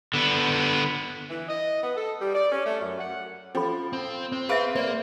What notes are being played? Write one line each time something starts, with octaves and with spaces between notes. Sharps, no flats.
D3 B3
E3
D#5
B3
A4
G3
D5
C#4
A3
F#2
F#5
F3 C#4 A4 B5
C4
C4 C5
G#4 B4 E5 F5 D7
A#3 B4 C5 D5